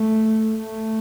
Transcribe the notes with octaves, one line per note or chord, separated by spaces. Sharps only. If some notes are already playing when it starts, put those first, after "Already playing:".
Already playing: A3
A3